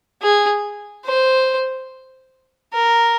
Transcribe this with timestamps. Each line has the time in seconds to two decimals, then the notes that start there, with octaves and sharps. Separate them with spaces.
0.22 G#4
1.06 C5
2.74 A#4